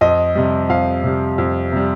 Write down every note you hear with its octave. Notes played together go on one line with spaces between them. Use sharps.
F2 D#5
C3 G3
F2 F5
C3 G3
F2
C3 G3